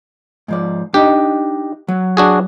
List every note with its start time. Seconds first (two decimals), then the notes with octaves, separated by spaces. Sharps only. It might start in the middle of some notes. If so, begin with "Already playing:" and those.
0.48 G#2 F3 D5
0.94 D4 D#4 G4 D#5
1.88 F#3
2.17 D4 F#4 G#4